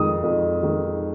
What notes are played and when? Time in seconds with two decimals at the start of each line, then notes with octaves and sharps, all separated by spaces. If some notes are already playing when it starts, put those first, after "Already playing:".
Already playing: F2 D#3 G#3 D#6
0.23 F2
0.63 D#3 G#3